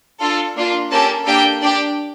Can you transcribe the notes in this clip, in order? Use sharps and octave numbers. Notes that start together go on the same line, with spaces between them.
D4 F4 A4
A#3 D4 F4
A#3 C#4 G4 A4 A5
A#3 D4 G4 A4 G5
D4 G4 D5